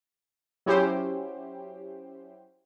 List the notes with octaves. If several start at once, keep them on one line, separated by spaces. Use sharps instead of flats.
F#3 C#4 E4 G4 C5